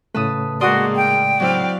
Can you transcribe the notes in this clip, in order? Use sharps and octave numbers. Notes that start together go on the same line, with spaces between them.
A2 C#3 A3 B4 A5 D#6
G#3 A#3 F#4 D5 C6 D#6
G5
F#3 C4 E4 D5 F5